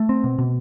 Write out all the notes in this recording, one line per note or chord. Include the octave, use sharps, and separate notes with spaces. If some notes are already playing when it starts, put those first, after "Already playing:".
Already playing: A3
C4
B2
B2